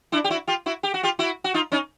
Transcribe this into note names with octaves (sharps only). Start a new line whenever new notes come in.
D4 E4
G4
E4 F#4
F4 G4
E4 F#4
G4
F#4
F4 G4
E4 F#4
F#4
D#4 F4
C#4 D#4